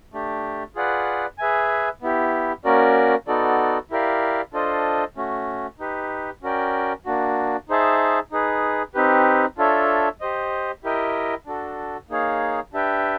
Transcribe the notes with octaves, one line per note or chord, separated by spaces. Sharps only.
A3 D4 G4
F4 G#4 B4 D5 F#5
G#4 B4 E5 G#5
B3 E4 G4
A#3 C#4 F#4 A#4 D5
B3 D#4 F#4 A4 D5
E4 G4 A#4 D5 F5
D4 F4 A4 C5 D#5
A3 C#4 F#4
D#4 G4 B4
C#4 F#4 A#4 D5 G5
A#3 D4 F#4
D#4 G#4 C5 E5 A5
D#4 G#4 B4
C4 D#4 G4 B4
D4 F4 A4 C#5 E5
G4 C5 D#5
E4 G4 A#4 D#5 G5
D4 F#4 A4
A#3 D#4 G#4 C#5 F5
D4 G4 B4 E5 G5